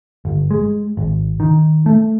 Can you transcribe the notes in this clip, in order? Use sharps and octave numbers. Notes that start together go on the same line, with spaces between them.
G1
G#3
G#1
D#3
A3